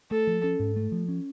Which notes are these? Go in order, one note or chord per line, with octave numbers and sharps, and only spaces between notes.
A3 A4
F3
C#4
G#2
A3
F3
C#4